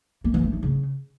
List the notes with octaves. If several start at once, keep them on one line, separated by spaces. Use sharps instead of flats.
A#3
E3
A3
D#4
C#3